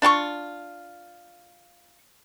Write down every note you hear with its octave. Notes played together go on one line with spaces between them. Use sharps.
D4 F4 A5 C#6